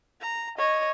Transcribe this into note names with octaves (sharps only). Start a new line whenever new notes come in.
A#5
C#5 D#5